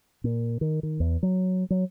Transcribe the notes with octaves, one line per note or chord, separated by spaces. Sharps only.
A#2
D#3
D#3
E2
F#3
F#3